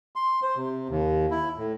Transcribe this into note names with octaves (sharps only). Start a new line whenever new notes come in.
C6
C5
C3
D#2
E4
A2